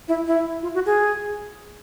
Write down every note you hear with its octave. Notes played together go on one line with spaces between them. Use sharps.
E4
E4
F4
F#4
G#4